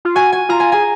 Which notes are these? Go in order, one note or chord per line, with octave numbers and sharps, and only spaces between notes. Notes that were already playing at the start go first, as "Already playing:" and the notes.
F4
F#4 G#5
G#5
F4 A#5
G#5
G#4 G#5